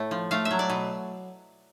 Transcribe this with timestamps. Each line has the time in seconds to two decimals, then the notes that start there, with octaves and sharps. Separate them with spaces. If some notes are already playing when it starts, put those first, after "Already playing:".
Already playing: A2 A3
0.11 F3
0.31 A3 F5
0.45 E5
0.51 F#3
0.59 D5
0.70 B2